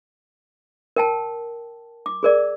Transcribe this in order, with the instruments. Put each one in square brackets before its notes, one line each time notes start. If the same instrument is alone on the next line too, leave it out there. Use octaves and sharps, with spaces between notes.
[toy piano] A#4 G5 A5
D6
G#4 A#4 D5